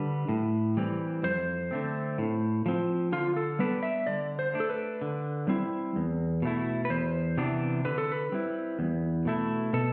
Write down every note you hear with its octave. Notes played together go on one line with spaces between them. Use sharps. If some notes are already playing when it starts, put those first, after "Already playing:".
Already playing: D3 G3 B4
A2
E3 G3 C4
F2 C5
D3 A3 C4
A2
F3 C4
D3 F4
A4
G3 B3 D4 B4
E5
D3 D5
C5
A3 D4
A4
B4
D3
G3 C4 E4
E2
B2 A3 E4
B4
E2 C5
C3 E3 B3 D4
D3 B4
A4
B4
G3 C4 E4
E2
B2 A3 E4
B2 A4